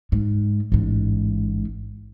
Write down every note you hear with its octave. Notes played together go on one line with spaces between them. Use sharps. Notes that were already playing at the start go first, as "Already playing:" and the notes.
G#2
A1 G#2